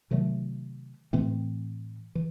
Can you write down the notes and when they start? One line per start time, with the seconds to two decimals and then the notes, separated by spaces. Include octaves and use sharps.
0.11 C3 D#3 F#3 A3
1.13 A2 E3 A3 C4
2.15 E3